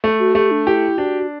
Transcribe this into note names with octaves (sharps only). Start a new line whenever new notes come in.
A3
F#4
A3 G4
D4
E4 G4
D4 F#4